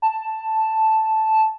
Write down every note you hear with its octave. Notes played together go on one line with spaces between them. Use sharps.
A5